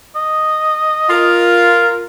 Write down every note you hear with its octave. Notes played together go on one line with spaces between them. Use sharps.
D#5
F4 A#4